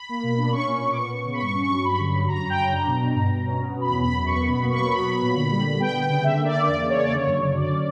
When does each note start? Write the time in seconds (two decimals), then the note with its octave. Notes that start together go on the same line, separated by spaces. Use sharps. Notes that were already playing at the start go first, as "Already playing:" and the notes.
Already playing: B5
0.09 A#3
0.23 B2
0.38 D4
0.52 C#4 C#6
0.67 A#2
0.74 C#6
0.82 A#2
0.92 D6
0.96 B3 C#6
1.11 B3
1.25 C#3
1.33 B5
1.41 G2 C#6
1.55 C#4
1.62 C#6
1.69 F#3
1.84 G2 B5
1.99 D3
2.14 F#3
2.28 F#2 A#5
2.43 C#4
2.50 G5
2.58 C#3
2.72 D4 A#5
2.87 B2
3.01 B2
3.15 G2
3.30 G2
3.46 C#4
3.60 B3
3.75 B2
3.81 B5
3.89 E2
4.03 F#2 B5
4.19 F#2
4.26 C#6
4.34 B3
4.47 B2 B5
4.63 A#3
4.70 C#6
4.78 F#3
4.91 B3 B5
5.06 B3
5.22 A#2
5.35 D3
5.51 G3
5.65 D3
5.79 B3 G5
5.95 B3
6.08 C#3
6.24 D3 E5
6.38 A#3
6.45 D5
6.53 A#3
6.67 E2 D5
6.82 C#3
6.90 C#5
6.97 C#3
7.03 D5
7.11 D3 C#5
7.26 F#2
7.40 F#3
7.56 D3 D5
7.70 C#4